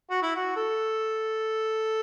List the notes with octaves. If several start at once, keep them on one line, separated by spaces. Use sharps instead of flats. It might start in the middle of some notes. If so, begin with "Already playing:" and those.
F#4
E4
F#4
A4